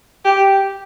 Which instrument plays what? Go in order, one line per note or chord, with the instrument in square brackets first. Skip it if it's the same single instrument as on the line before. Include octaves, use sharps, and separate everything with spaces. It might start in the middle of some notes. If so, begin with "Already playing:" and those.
[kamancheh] G4